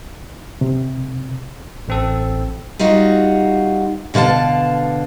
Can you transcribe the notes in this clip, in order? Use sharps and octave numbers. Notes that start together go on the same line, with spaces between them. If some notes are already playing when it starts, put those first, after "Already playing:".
C3
A1 C4 A4
G3 D#4 F4 F#4
B2 D3 B4 F5 A5